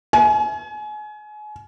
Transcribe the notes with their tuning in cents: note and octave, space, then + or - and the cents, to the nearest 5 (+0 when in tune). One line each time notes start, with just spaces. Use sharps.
G#5 +30